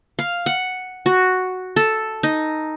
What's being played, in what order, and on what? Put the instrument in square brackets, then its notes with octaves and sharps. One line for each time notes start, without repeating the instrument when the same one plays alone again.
[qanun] F5
F#5
F#4
A4
D#4